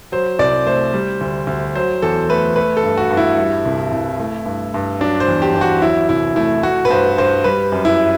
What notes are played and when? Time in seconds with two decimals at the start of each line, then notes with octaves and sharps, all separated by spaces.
0.12 F#3 C5
0.39 C2 D5
0.66 A3 C5
0.93 G3
1.21 D2
1.47 D2
1.75 F#3 C5
2.02 E2 A4
2.30 A3 B4
2.56 A3 B4
2.77 A4
2.83 G2
2.97 F#4
3.10 G2
3.17 E4
3.38 G3
3.65 C2
3.92 C2
4.20 A3
4.46 G2
4.74 G2
5.00 F#3 D4
5.20 C5
5.28 E2
5.42 G4
5.55 E2
5.61 F#4
5.82 F#3 E4
6.09 C2 E4
6.36 A3 E4
6.63 A3 F#4
6.85 B4
6.90 G2 C5
7.18 G2 C5
7.44 G3 B4
7.72 F#2
7.85 E4